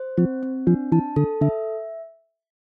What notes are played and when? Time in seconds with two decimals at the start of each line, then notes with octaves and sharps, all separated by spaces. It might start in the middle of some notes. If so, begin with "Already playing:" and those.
Already playing: C5
0.18 F3 C4
0.43 C4
0.67 F3 D4
0.92 E3 A5
1.16 D3 A4
1.41 D3 E5